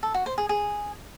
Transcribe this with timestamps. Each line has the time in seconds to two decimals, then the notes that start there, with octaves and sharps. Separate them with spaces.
0.03 A4
0.14 F#4
0.26 C5
0.38 G#4
0.49 G#4